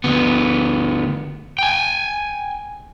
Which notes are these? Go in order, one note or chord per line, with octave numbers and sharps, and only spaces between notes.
D2 B3
G5 G#5